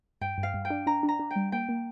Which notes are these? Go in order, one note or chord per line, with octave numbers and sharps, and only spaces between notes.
G2 G5
G2
F5
G2
G5
D4
D4 A#5
D4
A#5
D4
G5
G3
A#3 G5
A#3